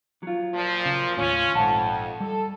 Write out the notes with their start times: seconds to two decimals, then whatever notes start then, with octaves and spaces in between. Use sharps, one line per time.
0.23 F#3 F4
0.54 A#2 F3
0.86 C#3
1.17 D#2 A2 C#4 F4
1.55 A#1 F2 G#2 F#5 A5
2.20 G3 A4